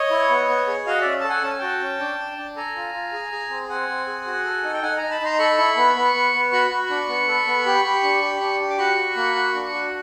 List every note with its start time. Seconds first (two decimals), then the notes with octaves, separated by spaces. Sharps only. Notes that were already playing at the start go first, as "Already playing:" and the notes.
Already playing: C#5 D#5
0.11 E4
0.30 B3
0.48 B3
0.67 G#4
0.87 F#4 D#5 F5
1.01 C#4 D5 E5
1.21 A4 A5
1.29 F#5 G#5
1.43 C#4 A5
1.51 G#5
1.59 F#4 G5 A5
1.81 C#4
2.00 D4
2.18 D4
2.38 D4
2.56 A4 G#5 A#5
2.76 F4
2.94 F4
3.13 G#4
3.32 G#4
3.50 C4
3.69 C4 F#5 G#5
3.89 C4
4.07 G#4
4.27 F#4
4.45 A4
4.64 D#4
4.73 G5
4.83 D#4 F#5 G#5
4.97 D#4 G#5 A#5
5.11 A5 B5
5.21 D#4 A#5 C6
5.39 A4 B5 C#6
5.58 E4
5.76 B3
5.96 B3
6.14 B3
6.34 B3
6.52 F#4 B5 C#6
6.71 F#4
6.90 D4
7.09 B3
7.28 A4
7.47 B3
7.66 G4
7.84 G4
8.03 D4
8.22 G4
8.41 D4
8.60 G4
8.70 D6
8.78 F#4 B5 C#6
8.97 F#4
9.16 A#3
9.35 F#4
9.54 D4
9.73 F#4